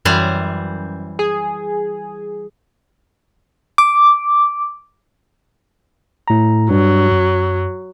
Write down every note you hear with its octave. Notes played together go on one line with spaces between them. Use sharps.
F#2 E3 G3 C5
G#4
D6
A2 A#5
G2 F#3
F#2